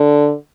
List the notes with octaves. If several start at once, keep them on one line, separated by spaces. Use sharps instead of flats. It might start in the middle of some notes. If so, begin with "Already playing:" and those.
Already playing: D3